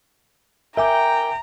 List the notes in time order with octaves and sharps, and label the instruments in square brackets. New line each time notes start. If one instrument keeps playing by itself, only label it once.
[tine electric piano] A#4 G#5 D6 [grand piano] E5 [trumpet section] G5 [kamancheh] A#5